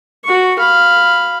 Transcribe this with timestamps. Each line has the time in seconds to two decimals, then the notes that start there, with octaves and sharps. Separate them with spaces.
0.25 F#4 C#6
0.59 F5 B5